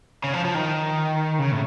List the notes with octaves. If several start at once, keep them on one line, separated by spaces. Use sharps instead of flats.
C#3
F3
F3
D#3
C#3
A2